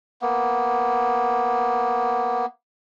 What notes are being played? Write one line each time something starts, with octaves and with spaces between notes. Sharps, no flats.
A#3 B3